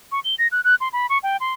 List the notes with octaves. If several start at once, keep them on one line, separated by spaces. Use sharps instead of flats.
C#6
G7
A#6
F#6
F#6
C6
B5
C#6
G5
C6